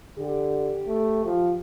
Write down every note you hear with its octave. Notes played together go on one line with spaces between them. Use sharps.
D3 G4
A3
F3